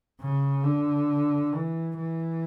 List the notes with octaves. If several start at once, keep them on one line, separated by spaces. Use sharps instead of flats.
C#3
D3
E3
E3